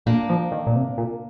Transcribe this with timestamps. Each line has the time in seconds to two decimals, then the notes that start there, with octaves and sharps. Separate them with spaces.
0.06 A#2 A#3 D4
0.29 F3
0.52 D#3
0.67 A#2
0.75 C3
0.97 A#2